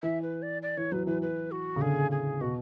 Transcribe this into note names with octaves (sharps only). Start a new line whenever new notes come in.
E3 E5
B4
D5
D5
E3 C#5
F#3 B4
E3 B4
B4
F#4
C#3
D3 G#4
G#4
B2 F#4